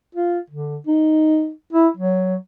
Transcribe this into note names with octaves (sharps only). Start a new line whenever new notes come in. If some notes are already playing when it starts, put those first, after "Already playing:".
F4
D3
D#4
E4
F#3